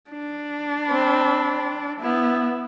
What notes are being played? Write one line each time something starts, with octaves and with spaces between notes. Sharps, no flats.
D4
C4 B5
B3 E4